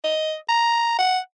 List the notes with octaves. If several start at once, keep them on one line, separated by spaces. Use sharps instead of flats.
D#5
A#5
F#5